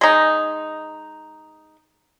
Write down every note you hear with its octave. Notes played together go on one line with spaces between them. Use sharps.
G#3 D#4